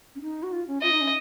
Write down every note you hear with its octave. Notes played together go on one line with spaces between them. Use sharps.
C#4
D#4
F#4
F4
C#4
F4 D#5
D#4
C#4